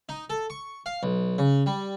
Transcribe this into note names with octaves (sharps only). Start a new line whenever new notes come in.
D#4
A4
C#6
F5
B1
C#3
G3